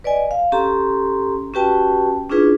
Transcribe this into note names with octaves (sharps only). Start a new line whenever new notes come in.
B4 D5 D#5 G#5
F5
C#4 G4 A4 A#5 C6
C#4 F#4 G4 B4 G5 A5
C#4 D4 E4 F4 G#4 B4